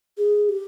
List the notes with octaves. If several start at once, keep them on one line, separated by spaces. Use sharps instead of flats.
G#4
G4